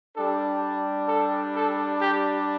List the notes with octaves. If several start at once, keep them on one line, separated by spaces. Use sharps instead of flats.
G3 D4 G4 A4
A4
A4
G4